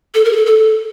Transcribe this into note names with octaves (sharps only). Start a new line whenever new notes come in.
A4
A#4
G#4
A4
A4